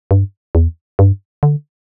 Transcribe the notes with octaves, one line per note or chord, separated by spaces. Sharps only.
G2
E2
G2
D3